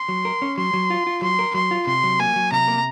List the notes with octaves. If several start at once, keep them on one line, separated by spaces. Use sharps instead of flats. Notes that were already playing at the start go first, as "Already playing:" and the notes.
Already playing: C6
F#3
A#4
C#4
F#3 C6
F#3
F4
F4
F#3 C6
A#4
F#3 C6
F4
C3 C6
F#3
A#3 G#5
F#3
C3 A#5
A#3